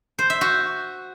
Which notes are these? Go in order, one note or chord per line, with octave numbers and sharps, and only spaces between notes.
C5
E5
F#4